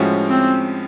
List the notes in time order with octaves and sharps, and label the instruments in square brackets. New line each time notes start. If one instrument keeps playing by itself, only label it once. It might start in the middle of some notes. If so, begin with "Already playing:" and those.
Already playing: [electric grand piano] A2 F3 G#3 C#4 F#4
[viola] C4